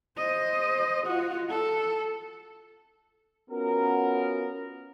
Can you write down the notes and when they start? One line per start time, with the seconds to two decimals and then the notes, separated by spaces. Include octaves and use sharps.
0.18 C5 D#5
1.06 F4 F#4
1.50 A4
3.50 B3 C#4 F4 F#4 A#4